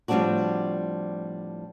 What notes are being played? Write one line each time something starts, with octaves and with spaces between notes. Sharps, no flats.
A2 F3 G3 C4 D4 F#4